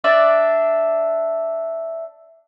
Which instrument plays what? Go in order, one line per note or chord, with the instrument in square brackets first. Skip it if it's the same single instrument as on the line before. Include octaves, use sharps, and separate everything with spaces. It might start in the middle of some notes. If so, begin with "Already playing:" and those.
[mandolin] D4 D5 E5